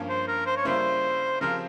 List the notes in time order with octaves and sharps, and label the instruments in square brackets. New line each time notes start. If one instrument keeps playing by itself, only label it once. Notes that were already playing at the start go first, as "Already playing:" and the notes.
Already playing: [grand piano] G2 F3 A#3 C#4
[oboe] C5
A#4
C5
C#5
[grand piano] C#3 G3 A#3 C#4 E4 [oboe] C5
[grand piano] C#3 F3 C4 G4 [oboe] A#4